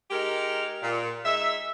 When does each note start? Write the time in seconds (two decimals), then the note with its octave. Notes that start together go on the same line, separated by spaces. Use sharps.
0.11 G#3 D#4 G4 A#4
0.81 A#2
1.25 G#3 D#4 E5